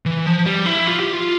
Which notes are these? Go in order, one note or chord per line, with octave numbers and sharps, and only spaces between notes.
E3
F3
G3
E4
F4
G4
F4